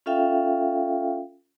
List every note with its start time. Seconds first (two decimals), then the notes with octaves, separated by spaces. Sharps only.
0.06 C#4 F4 A4 E5 F5 G5